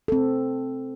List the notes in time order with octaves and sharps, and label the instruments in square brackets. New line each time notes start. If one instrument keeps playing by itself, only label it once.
[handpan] C4 A4